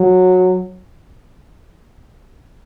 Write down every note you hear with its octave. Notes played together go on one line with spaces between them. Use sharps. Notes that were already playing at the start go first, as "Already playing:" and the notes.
Already playing: F#3